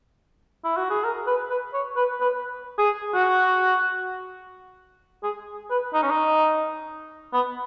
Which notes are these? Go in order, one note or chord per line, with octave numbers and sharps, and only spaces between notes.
E4
F#4
G#4
A#4
B4
B4
C#5
B4
B4
G#4
F#4
G#4
B4
D#4
C#4
D#4
B3